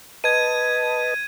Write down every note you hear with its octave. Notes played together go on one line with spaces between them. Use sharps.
B4 D#5 A5 G#6 D#7